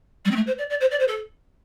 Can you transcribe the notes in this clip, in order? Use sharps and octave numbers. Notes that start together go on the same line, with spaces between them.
G3
C4
A3
C5
D5
D5
C5
D5
C5
A4